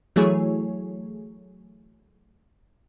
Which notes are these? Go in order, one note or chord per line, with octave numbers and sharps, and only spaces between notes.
E3 F#3 A3 E4 G#4 C#5